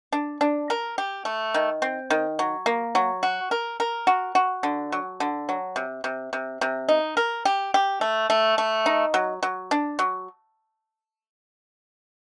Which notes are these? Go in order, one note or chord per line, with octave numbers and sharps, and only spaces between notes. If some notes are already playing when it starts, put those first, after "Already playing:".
D4
D4
A#4
G4
A3
D#3
C4
D#3
F#3
A#3
F#3
F#4
A#4
A#4
F#4
F#4
D3
F#3
D3
F#3
C3
C3
C3
C3
D#4
A#4
G4
G4
A3
A3
A3
D#4
F#3
F#3
D4
F#3